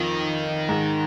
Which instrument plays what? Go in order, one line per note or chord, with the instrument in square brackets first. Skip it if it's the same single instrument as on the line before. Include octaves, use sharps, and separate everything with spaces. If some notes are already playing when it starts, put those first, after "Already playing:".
Already playing: [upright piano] F2 F3 [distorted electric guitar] D#3
[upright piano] G#2 G#3